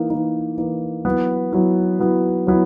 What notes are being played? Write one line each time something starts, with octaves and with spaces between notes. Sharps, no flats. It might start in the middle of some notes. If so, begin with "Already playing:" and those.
Already playing: E3 A#3 D#4
E3 A#3 D#4
E3 A#3 D#4
F#3 B3 E4
F#3 B3 E4
F#3 B3 E4
F#3 B3 E4